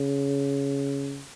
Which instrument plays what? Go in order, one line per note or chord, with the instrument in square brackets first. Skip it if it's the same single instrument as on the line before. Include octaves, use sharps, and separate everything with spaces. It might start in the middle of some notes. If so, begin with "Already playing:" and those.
Already playing: [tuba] C#3